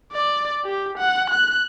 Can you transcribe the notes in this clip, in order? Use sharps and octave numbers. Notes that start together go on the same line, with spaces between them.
D5
G4
F#5
F#6